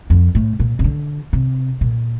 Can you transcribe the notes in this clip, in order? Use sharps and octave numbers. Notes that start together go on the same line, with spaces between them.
F2
A2
A#2
C3
D3
C3
A#2